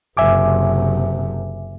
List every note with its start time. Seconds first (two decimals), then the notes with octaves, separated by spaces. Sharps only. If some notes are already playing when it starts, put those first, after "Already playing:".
0.17 F#1 C3 E5 G#5 D6